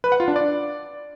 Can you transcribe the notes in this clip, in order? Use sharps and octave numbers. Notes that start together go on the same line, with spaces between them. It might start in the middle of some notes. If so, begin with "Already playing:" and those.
B4
F#5
F4
D4
D5